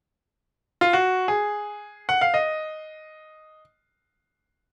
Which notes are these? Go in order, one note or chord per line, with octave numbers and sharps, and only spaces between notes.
F4
F#4
G#4
F#5
F5
D#5